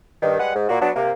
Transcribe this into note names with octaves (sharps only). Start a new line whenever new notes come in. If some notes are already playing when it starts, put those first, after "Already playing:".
G2 D#3
G3 G#3 B4 F#5
G#2
A#2 A#3 F#4
F#3 B3 D4
C3 A#3